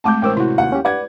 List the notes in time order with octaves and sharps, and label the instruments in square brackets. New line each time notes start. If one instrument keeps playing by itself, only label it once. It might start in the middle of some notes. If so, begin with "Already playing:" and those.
[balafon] G#3 A3 C4 [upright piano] A5 D6 G6
[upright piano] A1 [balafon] G#3 A#4 C5 [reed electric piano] G5 D6 E6
[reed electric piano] C3 F#4 [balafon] E4
[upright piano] D#2 F#5
[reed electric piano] C#4 G4
[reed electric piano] B4 D5 [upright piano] F#5 G#6